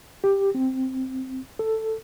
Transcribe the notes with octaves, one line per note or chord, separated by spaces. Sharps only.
G4
C4
A4